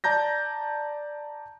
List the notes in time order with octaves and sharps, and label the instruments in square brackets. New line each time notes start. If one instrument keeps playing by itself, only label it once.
[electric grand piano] D5 A5 A#5 G6 A#6